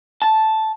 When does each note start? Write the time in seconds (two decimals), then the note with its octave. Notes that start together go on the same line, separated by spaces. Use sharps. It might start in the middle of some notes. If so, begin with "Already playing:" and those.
0.22 A5